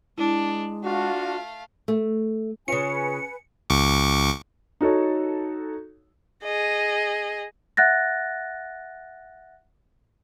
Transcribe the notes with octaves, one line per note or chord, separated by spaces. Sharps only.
G#3 D4 E4
A3 D4 F4 F#4 F5
A3
C#3 C#4 F4 B4 G#5 C#7
C#2 C#6 D6
D#4 F#4 A4 C#5
G#4 D#5
E5 F#5 F#6 A6 A#6